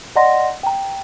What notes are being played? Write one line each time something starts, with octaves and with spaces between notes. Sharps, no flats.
D5 D#5 F#5 A#5 C6 A#6
G5 A#5